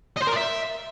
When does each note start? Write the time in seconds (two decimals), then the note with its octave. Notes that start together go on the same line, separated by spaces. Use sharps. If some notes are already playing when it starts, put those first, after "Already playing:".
0.17 D#5
0.22 C5
0.27 A#4
0.32 D5
0.37 E5